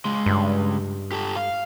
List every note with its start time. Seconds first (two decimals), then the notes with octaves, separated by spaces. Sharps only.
0.05 C#2 G#3
0.26 G2
1.12 G4 A4
1.36 F5